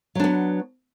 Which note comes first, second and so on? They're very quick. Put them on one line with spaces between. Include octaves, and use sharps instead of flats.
F#3 D4 B3